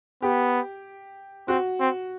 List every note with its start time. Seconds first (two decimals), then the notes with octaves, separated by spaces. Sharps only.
0.22 B3 G4
1.48 C4 F#4
1.80 C4